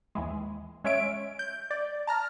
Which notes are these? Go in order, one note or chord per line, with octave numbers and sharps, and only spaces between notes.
D#2 E3 G#3
G#3 C#4 C#5 E5 D7
G6
D5
A5 A#5 F6